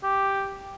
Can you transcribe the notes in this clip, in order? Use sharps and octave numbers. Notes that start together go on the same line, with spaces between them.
G4